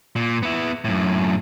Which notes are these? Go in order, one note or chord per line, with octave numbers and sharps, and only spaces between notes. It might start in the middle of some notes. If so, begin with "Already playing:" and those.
A#2
B3 E4
F#2 A2